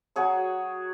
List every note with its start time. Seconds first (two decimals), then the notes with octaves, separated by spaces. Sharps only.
0.16 F#3 F#4 G#4 C#5